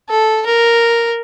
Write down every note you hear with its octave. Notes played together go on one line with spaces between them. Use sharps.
A4
A#4